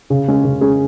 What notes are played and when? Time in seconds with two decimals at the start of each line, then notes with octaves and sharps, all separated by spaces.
0.10 C#3
0.28 G#3 C#4 G#4
0.44 C#3
0.61 G#3 C#4 G#4